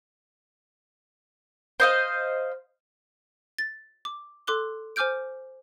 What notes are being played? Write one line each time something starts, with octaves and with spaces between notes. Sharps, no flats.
C5 D#5 F5
A6
D6
A4 C6 D6 F#6 G7
C5 G#5 D6 F6 G6 D7